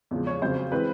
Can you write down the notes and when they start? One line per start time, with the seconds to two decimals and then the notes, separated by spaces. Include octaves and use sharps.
0.11 E2 C#3 F3 G#3
0.27 C#5
0.42 F2 C#3 F#3 C5
0.72 E3 G#3 C4 B4